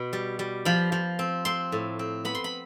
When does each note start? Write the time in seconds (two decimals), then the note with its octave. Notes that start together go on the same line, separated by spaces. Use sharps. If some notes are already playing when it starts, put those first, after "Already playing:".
Already playing: B2 B3
0.13 G3
0.39 G3
0.65 F3 B5
0.92 F3
1.19 C4
1.45 C4 C6
1.72 A2
1.99 C4
2.25 B3 B5
2.35 C6
2.44 B5